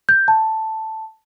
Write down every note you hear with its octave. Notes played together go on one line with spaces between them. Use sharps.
G6
A5